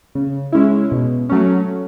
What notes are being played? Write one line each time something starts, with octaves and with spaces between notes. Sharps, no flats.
C#3
G#3 C#4 E4
B2
F#3 A3 C#4